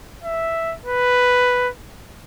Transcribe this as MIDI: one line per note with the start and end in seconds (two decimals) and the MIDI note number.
0.23 0.75 76
0.86 1.70 71